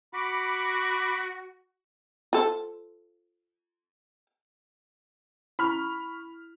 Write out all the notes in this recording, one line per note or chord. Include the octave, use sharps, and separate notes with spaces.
F#4 B5 D6
F4 A4 C5
E4 B5 C#6 F6